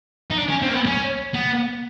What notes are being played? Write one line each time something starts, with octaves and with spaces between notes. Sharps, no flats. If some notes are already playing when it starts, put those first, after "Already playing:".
D#4
D4
C#4
C4
A#3
B3
C#4
B3